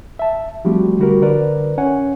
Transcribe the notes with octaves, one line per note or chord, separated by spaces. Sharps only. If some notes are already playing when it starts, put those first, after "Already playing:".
E5 A5
F3 G3 A3 C4 F#4 G4
D3 G3 F#4 G4 A#4
D3 A#4 B4 D5
C#4 C#5 F#5 G#5